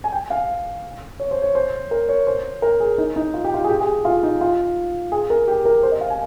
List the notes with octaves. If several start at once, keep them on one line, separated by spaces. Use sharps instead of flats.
G#5
G5
F5
C#5
C5
C#5
C5
A#4
C#5
C5
A#4
G#4
D#4
D#4
F4
G4
F4
G#4
G4
G#4
F4
D#4
F4
G#4
A#4
G4
A#4
C5
D#5
F5
G#5